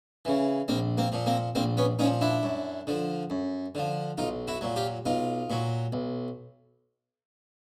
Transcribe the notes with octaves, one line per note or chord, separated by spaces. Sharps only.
C#3 E3
A#1 A#3 C4
A#3 C4
A#2 F3
A#3 C4
A#1 A#3 C4
B3 C#4
A#2 F3 C#4 D#4
D4 E4
F#2
D3 F3
F#2
D3 F3
B1 D#4 F4
E4 F#4
A#2 F#3
F4 G4
B1 D#4 F4
A#2 F#3
B1